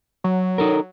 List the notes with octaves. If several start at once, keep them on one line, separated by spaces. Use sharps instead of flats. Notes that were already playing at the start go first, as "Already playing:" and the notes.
F#3
D#4 A4 A#4